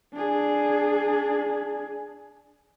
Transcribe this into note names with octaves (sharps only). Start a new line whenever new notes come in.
D4 G#4